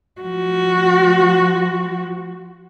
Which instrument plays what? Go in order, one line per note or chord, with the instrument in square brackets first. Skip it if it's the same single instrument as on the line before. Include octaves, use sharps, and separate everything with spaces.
[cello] F3 F#4